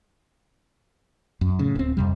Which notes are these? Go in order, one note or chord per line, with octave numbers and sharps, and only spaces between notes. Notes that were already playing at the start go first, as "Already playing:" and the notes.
F#2
A2 C#3
D1 C4
F2 C3 G3